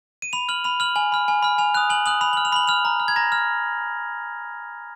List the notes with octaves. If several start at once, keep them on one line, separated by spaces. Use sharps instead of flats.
D#7
B5 F7
F6 F#7
B5 F7
F6 F#7
G#5 F#7
B5 F6
G#5
B5 F6
G#5 F7
D#6 F#6 F7
G#5 F#7
D#6 F#6 F#7
B5 F7
F6 F#7
F7
B5 F#7
F6 F7
A#5
F6
G#6
A#5 A#6
F6